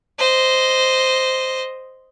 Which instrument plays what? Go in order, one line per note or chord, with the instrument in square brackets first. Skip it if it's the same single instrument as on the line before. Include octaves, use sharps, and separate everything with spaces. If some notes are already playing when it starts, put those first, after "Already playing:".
[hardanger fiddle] C5 D#5